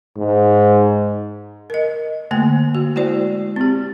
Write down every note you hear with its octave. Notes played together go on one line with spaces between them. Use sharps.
G#2
A#4 D#5
D3 A3 A#3 G#5
F#4
G#3 E4 F#4 C5 D5
C4 G4